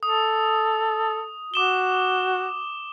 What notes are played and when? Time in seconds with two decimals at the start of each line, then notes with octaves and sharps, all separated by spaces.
0.03 A4 D#6
1.54 F#4 D6 E7 G7